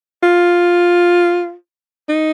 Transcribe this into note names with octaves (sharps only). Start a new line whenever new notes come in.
F4
D#4